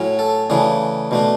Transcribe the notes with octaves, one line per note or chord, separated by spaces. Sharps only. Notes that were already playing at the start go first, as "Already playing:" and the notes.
Already playing: A2 F#3 C#4
A4
C#3 E3 A3 D4 G#4
B2 A3 D4